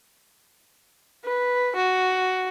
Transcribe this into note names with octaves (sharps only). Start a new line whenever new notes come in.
B4
F#4